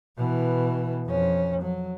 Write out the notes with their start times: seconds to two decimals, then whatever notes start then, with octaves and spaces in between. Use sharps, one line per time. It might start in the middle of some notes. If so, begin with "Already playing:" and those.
0.18 B2 E3
1.07 F2 C#4
1.62 F#3